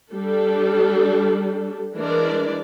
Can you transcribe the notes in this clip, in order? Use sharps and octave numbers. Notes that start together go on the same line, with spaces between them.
G3 D4 A4
E3 G#3 D4 A#4 D5